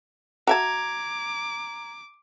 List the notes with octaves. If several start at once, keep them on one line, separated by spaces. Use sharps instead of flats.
F#4 E5 A5 A#5 D6 G#6